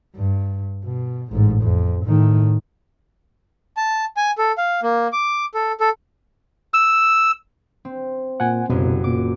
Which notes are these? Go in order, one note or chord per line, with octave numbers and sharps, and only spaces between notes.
G2
B2
A1 G#2
F2
A2 D#3
A5
G#5
A4
F5
A#3
D6
A4
A4
E6
C4
A#2 F#5 G#5
F#1 C2 F#2 B2
A#2 D6